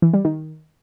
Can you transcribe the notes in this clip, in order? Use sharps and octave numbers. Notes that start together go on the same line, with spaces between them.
E3
G3
D#3